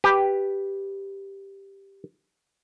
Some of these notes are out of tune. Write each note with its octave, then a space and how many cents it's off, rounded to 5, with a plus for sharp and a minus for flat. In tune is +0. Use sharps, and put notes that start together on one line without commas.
G4 +0 B4 +0